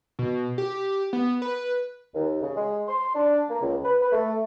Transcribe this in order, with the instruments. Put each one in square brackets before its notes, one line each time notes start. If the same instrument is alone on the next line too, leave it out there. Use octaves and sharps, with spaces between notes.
[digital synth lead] B2
G4
B3
B4
[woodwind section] D#2
C#3
G#3
C6
D4
A#3
C#2
B4
B4
A3